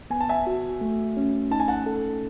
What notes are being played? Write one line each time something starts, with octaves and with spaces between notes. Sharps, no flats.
B3 G#5
A5
E5 G#5
F#4
A3
C#4
D#4 A5
G#5
F#5 A5
A4